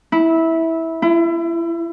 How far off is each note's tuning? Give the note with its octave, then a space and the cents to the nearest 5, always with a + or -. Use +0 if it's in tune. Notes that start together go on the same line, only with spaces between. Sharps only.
E4 -15
E4 +30